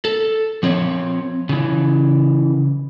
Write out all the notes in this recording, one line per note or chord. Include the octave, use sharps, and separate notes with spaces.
A4
F3 C4 C#5
C#3 E3